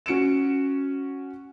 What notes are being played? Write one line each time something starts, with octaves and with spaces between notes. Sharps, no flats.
C#4 F#4 C#7 D7 E7